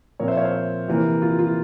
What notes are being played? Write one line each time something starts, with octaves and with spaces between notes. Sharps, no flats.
A#2 F3 C4 A#4 C#5
C5 E5
C#5 F5
C5 E5
C3 E3 A#3
F4
F4